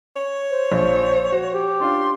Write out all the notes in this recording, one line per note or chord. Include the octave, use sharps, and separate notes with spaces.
C#5
C5
A#1 F3
F#4
G4
C#4 D4 F4 C6